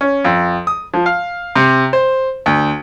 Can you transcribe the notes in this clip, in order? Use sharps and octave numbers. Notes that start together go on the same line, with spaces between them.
C#4
F2
D#6
F3
F5
C3
C5
D2